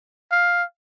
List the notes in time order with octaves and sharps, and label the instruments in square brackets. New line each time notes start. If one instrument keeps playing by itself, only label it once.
[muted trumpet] F5